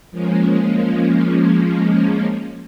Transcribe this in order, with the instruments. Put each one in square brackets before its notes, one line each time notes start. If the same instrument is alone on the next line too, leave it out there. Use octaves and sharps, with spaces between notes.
[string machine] F3 G#3 A#3 C#4